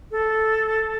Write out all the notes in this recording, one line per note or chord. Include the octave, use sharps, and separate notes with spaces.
A4